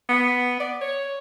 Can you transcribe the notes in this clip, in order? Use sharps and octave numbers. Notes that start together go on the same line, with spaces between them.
B3
D5
C#5